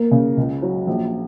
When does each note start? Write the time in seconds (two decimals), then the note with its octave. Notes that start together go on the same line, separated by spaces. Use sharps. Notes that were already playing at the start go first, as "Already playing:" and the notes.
Already playing: A#3
0.11 C#3
0.37 C#2
0.62 F#3
0.87 A#1